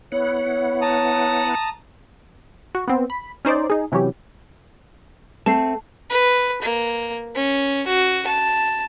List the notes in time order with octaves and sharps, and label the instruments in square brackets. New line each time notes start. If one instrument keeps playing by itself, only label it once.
[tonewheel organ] B3 E4 F#5 [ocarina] C#5
[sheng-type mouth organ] A5 A#5 D#6
[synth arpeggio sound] F#4
B3 C4
B5
C#4 D#4 C5 D5
D#4 G#4
C3 E3 F#3 C#4 G4
[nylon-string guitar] A3 C4 [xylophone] A5 C7
[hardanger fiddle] B4
A#3
C#4
F#4
A5